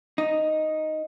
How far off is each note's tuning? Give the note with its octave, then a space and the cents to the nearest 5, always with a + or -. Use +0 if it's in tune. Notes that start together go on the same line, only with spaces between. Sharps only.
D#4 +0